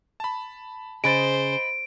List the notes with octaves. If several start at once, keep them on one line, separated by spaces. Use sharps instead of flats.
A5 B5
C#3 G#4 C5 D#5 B5 A6 D7